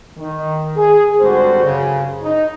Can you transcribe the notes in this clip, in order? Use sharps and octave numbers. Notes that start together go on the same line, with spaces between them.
D#3
G#4
G#1 D3 G3 F#4 C5
F#2 C#3
D#4